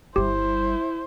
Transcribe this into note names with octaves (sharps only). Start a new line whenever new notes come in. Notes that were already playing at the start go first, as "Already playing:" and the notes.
G1 G3 E4 G4 C5